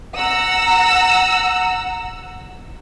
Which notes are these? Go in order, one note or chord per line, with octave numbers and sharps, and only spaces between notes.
F#5 A#5 E6